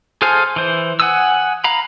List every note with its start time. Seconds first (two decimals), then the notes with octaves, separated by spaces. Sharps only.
0.22 G#4 A4 C5 F5 G#5
0.56 E3 C5
1.00 F#5 G#5 D#6 E6
1.64 F5 A#5 B5